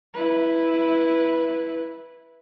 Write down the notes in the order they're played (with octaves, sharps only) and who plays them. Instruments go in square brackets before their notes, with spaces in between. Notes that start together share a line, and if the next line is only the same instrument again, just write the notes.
[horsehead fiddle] E4 B4